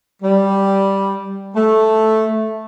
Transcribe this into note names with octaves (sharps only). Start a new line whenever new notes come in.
G3
A3